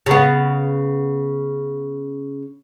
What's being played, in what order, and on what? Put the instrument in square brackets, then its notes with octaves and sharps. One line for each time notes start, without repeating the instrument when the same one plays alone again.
[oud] C#3 B3